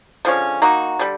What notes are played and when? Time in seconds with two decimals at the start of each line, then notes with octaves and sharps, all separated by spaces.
0.25 D3 F3 G#3 C#4
0.62 A#3 D#4 F#4
0.99 D3 G3